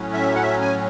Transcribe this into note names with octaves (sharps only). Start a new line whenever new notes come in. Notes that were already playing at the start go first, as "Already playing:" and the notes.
Already playing: A2 F#3 C#4
E5
F#5
E5
G#5